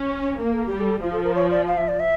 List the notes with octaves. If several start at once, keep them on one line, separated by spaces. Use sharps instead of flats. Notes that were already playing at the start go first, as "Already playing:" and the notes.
Already playing: C#4
A#3 A#4
A4
G3 G4
A4
F3 F4
A4
A#4
C#5
D5
F5
E5
D5
E5